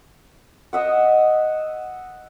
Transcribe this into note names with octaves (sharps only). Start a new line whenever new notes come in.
D#5 E5 F#5